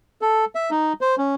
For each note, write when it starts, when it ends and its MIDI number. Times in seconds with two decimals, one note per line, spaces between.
0.22 0.45 69
0.55 0.70 76
0.71 0.93 63
1.01 1.15 72
1.18 1.35 61